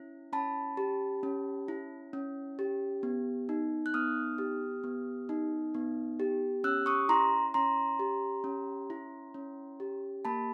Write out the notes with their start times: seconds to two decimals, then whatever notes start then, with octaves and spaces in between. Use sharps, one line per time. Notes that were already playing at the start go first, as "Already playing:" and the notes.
Already playing: C#4 E4
0.33 C#4 A5 B5
0.77 G4
1.23 C#4
1.68 E4
2.13 C#4
2.59 G4
3.03 B3
3.49 D#4
3.86 F#6
3.94 B3 D#6 F6
4.38 G4
4.84 B3
5.29 D#4
5.75 B3
6.20 G4
6.64 C#4 E6 F#6
6.86 C#6 D#6
7.09 E4 A#5 C6
7.54 C#4 A#5 C6
7.99 G4
8.44 C#4
8.90 E4
9.34 C#4
9.80 G4
10.25 A#3 A5 B5